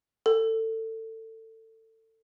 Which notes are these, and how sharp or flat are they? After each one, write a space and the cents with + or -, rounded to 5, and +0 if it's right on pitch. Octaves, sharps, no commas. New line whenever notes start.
A4 +25